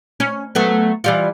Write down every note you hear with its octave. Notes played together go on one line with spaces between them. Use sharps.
C#4
F#3 A3 B3
E3 G3 F4